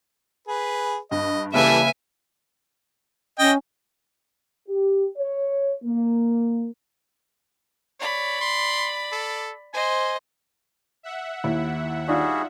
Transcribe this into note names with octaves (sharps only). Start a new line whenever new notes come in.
G#4 B4
G2 D#5
C#3 E3 G3 A#3 A4 B4 E5 G#5
C#4 D#5 G5
G4
C#5
A#3
C#5 D5 B5
C6
A4
C5 D#5 G#5
E5 F#5
D#2 E4
G3 D4 D#4 F4 F#4 G#4